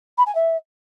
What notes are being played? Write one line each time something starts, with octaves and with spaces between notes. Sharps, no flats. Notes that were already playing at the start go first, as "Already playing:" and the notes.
B5
G#5
E5